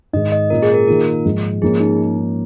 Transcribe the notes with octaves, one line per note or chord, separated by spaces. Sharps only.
G#2 D#3 G#3 D#5
D#5
A#2 G#3 C#4 F4 A#4
G#4
A#4
D#3 A#3 F4 A#4
G#2 F3 G#3
G#2 F3 A#3 C#4 G#4
D#4